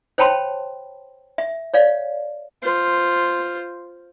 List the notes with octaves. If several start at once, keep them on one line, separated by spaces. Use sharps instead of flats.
C5 C#5 G5 A5 B5 C6
E5
C#5 D5 F5
F4 C5